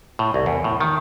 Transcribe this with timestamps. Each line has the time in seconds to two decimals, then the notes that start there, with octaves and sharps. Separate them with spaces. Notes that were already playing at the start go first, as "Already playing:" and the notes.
0.19 A2
0.34 C2
0.46 E2
0.64 A2
0.80 D#3